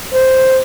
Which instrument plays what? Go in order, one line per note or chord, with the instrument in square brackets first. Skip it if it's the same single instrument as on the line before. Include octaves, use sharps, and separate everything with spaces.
[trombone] C5